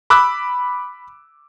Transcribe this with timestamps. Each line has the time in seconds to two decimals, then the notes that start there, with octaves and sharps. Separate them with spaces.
0.10 B5 D6 E6 F#6